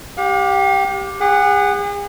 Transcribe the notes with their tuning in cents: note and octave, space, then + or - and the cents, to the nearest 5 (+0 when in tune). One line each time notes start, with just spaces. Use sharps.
G4 +0 F5 +45
G#4 -40 F#5 +0